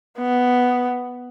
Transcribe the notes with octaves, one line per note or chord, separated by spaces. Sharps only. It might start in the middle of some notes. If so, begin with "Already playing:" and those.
B3